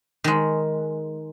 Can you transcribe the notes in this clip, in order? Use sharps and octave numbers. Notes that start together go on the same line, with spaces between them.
D#3 G#3